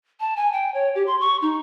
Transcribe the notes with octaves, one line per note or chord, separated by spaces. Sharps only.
A5
G#5
G5
C#5
G4
C6
C#6
D#4